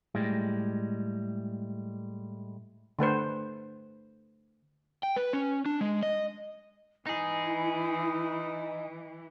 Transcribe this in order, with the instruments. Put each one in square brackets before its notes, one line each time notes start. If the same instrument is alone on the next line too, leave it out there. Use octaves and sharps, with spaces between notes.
[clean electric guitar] A2 G3 G#3
[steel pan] D3 A3 B4 C5
[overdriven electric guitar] G5
B4
C#4
D4
G#3
D#5
[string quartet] E3 [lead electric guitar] D#4 G#4 [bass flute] E4